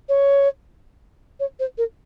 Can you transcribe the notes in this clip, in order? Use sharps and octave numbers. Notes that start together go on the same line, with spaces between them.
C#5
C#5
C5
A#4